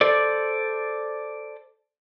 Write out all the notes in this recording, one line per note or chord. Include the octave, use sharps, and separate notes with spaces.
A4 C5 D5